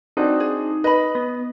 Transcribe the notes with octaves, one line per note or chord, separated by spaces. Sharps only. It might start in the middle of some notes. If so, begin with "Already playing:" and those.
C4 D4 D#4 F#4
G#4
B4 D#5 B5
B3